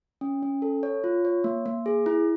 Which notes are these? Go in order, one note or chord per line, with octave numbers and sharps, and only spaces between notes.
C#4
C#4
A4
C#5
F4
C#5
A#3
A#3
G#4
E4